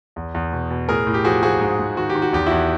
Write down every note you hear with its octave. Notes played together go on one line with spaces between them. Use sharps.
E2
E2
B2
B2
A2 G#4 A#4
A2
G4
F3 F#4 G#4
F3 F#4 G#4
G#2
G#2
D#3 F#4
G4
D#3
F#4
E2 G4
E2 E4 F#4